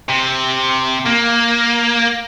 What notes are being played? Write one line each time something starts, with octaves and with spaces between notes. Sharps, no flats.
C3
A#3